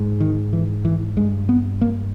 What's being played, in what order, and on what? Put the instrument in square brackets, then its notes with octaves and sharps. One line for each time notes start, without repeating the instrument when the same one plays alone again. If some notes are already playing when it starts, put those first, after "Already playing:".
Already playing: [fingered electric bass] G#2
D#3
E3
E3
G2 G#3
B3
A#3